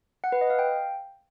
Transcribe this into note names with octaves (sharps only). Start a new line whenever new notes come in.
F#5
B4
D#5
F5
G5